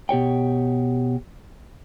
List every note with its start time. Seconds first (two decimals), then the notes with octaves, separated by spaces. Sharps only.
0.09 B2 G4 C#5 G5